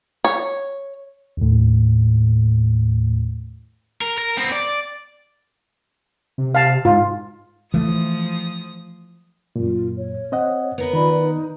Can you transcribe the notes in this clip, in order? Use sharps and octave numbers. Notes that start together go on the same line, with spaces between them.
C#5
D#2 A2
A#4
A#4
B3 C4
D5
C3
F5 A5
G#2 F4
E3 F3 A3 D#6
F#2 A#2 F4
C#5
C4 D#5 F#5
B3 A#4 B4
D#3 F4 D5 B5
D#4